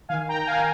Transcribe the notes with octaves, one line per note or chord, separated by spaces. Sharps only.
D#3 F5 G#5
G5 A#5
D#3
F5 G#5